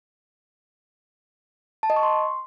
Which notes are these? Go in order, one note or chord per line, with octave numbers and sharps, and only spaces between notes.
A5
D#5
C#6
C6